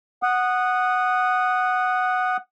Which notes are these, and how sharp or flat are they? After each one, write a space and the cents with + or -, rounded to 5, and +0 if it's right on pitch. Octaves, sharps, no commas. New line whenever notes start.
F#5 +0 D#6 -10